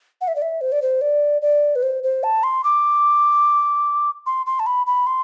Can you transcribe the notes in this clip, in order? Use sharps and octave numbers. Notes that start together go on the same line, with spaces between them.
F#5
E5
D5
E5
C5
D5
C5
D5
D5
B4
C5
C5
A5
C6
D6
C6
C6
A5
B5
B5
C6